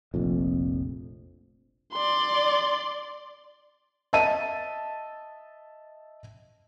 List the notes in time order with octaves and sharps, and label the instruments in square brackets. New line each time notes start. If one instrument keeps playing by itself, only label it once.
[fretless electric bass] F1 A#1 F2
[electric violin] D5 C6
[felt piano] D#5 E5 A5 D#7